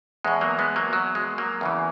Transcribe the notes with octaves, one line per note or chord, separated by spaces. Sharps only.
E2 B2 G#3
F#3 A#3
G#3 B3
F#3 A#3
F#3
G#3
F#3 A#3
E2 C#3 E3